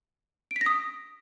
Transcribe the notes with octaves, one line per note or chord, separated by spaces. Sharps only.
D7
B6
A#6
D#6